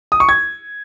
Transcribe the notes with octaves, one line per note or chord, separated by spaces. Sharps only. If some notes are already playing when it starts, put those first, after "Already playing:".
D#6
C#6
G#6